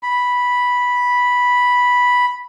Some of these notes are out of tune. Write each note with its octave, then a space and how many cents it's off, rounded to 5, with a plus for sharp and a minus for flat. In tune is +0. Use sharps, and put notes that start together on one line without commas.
B5 -5